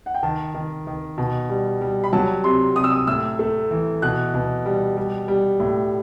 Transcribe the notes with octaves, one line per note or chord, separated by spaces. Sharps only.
F#5
G5
D#3 A5
D#3
D#3
B2
G3
G3
B5
F#3 A5
C3 C6
C3 D#6
E6
D#6
A2 E6
A3
E3
B2 F#6
B2
G3
G3
G3
A2